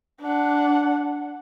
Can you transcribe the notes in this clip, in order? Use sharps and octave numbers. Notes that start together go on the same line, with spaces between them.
D4 F#5